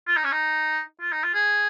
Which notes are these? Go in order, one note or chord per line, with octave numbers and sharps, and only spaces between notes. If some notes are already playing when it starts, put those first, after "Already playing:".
F4
D#4
C#4
D#4
F4
D#4
F4
G#4